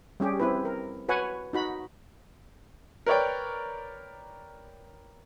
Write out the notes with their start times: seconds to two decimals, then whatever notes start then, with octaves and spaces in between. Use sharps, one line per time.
0.20 G3 C#4 G4 G#4
0.40 C4 E4 B4
0.65 A#4
1.08 F#4 B4 C#5 F#5 G#5
1.53 D#4 F#4 B5
3.06 A#4 B4 C#5 D5 G5